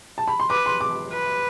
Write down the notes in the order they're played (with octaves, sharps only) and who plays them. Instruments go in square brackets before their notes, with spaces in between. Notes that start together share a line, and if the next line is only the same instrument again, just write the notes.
[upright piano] A5
B5
C6
[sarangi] B4 [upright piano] D6
[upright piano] C6
D6
[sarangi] B4